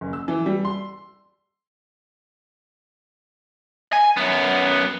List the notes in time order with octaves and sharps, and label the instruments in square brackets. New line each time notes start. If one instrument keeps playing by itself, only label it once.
[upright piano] F#1
E6
E3
G3
C6
[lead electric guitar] G#5
F#2 B3